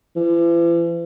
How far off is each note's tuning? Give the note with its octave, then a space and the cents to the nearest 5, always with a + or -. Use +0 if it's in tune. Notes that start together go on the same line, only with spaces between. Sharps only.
E3 +45